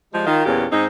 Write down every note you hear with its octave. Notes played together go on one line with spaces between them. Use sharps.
F3 G3 G#3
D#3 F4
E2 A#2 C#3 C#4 G4
G#2 C4 D#4